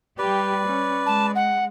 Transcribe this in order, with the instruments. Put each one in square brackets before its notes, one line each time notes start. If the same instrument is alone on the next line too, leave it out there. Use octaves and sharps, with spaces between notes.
[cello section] G3 G4 [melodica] B4 D5
[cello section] C#4
[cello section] G#3 [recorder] A5
[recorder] F#5